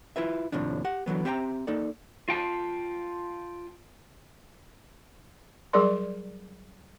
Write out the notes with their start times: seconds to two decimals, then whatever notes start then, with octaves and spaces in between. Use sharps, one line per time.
0.16 E4 F4 B4 E5
0.52 D#2 A2 C3 F3 D4
0.84 G4 F#5
1.06 D3 E3 F#3 B3
1.25 C4 G4 E5 G5 G#5 A#5
1.67 A#3 D#4 A4 D5
2.29 F4 G5 A5
5.73 F#3 G3 G#4 A#4 D5 C6